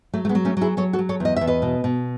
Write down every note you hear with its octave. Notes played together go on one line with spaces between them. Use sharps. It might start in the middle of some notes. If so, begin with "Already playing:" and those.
F#3 A3
A3
G#3 B3
F#3
A3 C#4
F#3 E4 G#4
F#3 A4 C#5
F#4 A4
F#3
A4 C#5
E2 D#5
E2 E5
B4 D#5
B2
B2